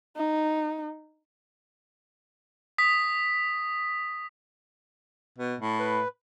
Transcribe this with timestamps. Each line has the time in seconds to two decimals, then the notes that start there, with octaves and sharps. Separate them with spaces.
0.17 D#4
2.78 D#6 B6
5.38 B2
5.60 A2
5.79 B4